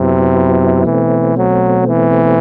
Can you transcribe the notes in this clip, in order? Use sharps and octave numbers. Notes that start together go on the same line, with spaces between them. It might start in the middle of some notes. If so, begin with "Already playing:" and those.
Already playing: F#2 C3 F#3 B3 E4
B2 E3 A3 C4
F#3
E3